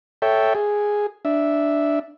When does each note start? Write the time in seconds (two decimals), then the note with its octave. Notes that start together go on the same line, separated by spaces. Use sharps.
0.22 A4 C#5 E5 G5
0.55 G#4
1.25 D4 E5